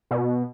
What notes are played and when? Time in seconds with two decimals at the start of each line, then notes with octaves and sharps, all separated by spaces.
0.11 B2